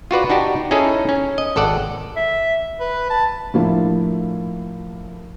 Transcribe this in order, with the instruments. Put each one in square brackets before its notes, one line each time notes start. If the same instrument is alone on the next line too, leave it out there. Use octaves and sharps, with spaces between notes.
[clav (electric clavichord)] F4 F#4 B4 D5
D4 D#4 F#4 G4
C#4 D#4 E4 G#4 A4
C#4
D#5
G#1 A4 D5 F#5
[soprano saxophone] E5
B4
A5
[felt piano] A2 F3 A#3 D4 E4